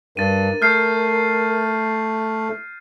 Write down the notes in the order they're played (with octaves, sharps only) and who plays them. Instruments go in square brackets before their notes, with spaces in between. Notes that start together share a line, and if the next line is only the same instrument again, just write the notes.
[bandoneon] G2 [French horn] A#4 [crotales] A6 D#7
[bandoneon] A3 [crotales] F6 G6 C7